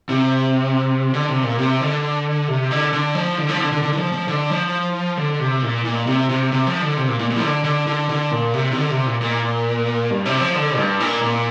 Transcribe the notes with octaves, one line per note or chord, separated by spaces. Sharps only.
C3
D3
C3
A#2
C3
D3
C3
D3
D3
F3
D3
F3
D3
D3
D3
D3
F3
F3
D3
F3
D3
C3
A#2
A#2
C3
C3
C3
F3
D3
C3
A#2
A#2
A#2
F3
D3
D3
D3
D3
A#2
C3
C3
D3
C3
A#2
A#2
G2
C3
F3
D3
G2
A#2
A#2